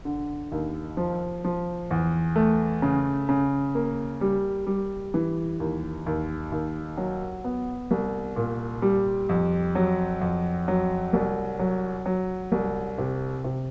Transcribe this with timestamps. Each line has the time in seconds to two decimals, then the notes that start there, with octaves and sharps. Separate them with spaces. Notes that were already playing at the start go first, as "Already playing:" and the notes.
0.05 D3
0.52 D#2
0.97 F3
1.44 F3
1.91 E2
2.36 A3
2.82 C#3
3.29 C#3
3.75 A#3
4.21 G3
4.67 G3
5.14 E3
5.60 D#2
6.06 D#2
6.52 D#2
6.97 F#3
7.44 B3
7.91 C2
8.36 A#2
8.82 G3
9.29 F2
9.75 F#3
10.21 F2
10.68 F#3
11.13 C2
11.59 F#3
12.06 F#3
12.52 C2
12.98 C3
13.44 C3